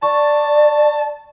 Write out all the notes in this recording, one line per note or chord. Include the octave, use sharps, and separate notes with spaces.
D5 A5 C#6